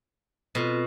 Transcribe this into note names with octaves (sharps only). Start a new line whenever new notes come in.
B2 C4 F4 A4